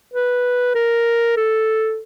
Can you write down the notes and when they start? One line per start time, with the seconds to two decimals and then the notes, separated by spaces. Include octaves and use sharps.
0.14 B4
0.75 A#4
1.37 A4